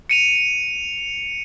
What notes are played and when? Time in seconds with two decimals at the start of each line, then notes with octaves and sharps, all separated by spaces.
0.10 C#7 D#7 F7